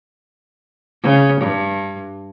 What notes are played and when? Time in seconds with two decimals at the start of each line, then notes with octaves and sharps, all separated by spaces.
1.03 C#3
1.41 G2